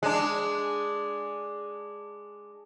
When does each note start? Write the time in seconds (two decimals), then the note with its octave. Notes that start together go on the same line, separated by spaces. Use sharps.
0.03 G#3 D4